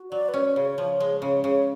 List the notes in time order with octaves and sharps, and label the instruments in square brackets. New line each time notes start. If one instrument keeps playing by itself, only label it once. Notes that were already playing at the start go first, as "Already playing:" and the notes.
Already playing: [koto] F#4
[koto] F#3 [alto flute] D5
[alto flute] B4
[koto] C#4 [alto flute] C#5
[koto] C#3 [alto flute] C#5
[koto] F3
G#3
[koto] C#3 [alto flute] C#5
[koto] C#3 [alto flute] C#5